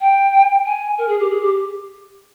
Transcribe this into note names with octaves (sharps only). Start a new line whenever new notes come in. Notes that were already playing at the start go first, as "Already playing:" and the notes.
G5
G#5
A#4
G#4
G4
G#4
G4